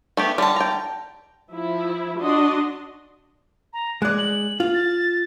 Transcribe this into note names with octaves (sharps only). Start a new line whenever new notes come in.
A3 B3 G4
D3 G3 A5
G5 A#5
F3 E4
D4 F#4 D#5 C6
A#5
G#3 D5 F#6
F#7
F4
A6